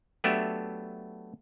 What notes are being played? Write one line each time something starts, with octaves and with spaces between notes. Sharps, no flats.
F#3 A3 B3 D4 G4 E5